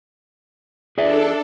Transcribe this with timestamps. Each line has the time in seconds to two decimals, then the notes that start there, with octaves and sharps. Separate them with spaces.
0.98 D4 G#4 A4 D5 E5